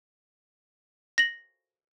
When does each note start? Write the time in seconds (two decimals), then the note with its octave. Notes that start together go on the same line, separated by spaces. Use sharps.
1.18 A#6 F#7